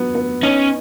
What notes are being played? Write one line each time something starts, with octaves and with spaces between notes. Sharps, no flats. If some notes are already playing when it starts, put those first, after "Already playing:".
Already playing: F#3 B3
B3
C#4 D#4